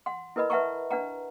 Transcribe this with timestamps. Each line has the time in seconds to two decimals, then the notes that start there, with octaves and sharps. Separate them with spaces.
0.06 F#5 C6
0.36 E4 A#4 B4 D#5 B5
0.50 B4 E5 F#5 A5 A#5 C#6
0.91 D4 B4 F#5 A#5